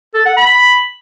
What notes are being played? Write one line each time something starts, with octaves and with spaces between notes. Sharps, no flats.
A4
F#5
B5